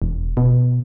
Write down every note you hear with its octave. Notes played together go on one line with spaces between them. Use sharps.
E1
B2